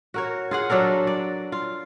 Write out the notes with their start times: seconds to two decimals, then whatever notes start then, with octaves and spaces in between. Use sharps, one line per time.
0.14 F#4 A#4 C#5
0.51 F4 G#4 F#5
0.70 F#3 D4 A4 A#4
1.07 D5
1.52 F4